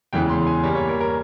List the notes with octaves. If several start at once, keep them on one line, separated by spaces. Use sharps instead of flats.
E2 C#3 E3 G#3 G5
C6
G#5
G2 G3 A#3 C#5
C#5
A#4
A#4